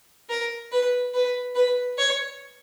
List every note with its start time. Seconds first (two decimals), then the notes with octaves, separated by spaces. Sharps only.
0.29 A#4
0.72 B4
1.14 B4
1.55 B4
1.98 C#5